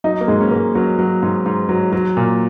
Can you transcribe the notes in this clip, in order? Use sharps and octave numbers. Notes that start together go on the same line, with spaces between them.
F#3 D#4
A#3
G#2 G#3
C#4
G#2 A#3
F#3 C#4
F#3
G#2
G#2
F#3
F#3
A#2